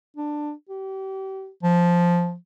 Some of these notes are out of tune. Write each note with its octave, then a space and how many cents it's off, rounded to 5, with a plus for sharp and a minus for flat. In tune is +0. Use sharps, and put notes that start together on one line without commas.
D4 +15
G4 -35
F3 +0